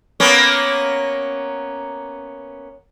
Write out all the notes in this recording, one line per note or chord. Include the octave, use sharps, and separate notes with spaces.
A#3 B3 C#4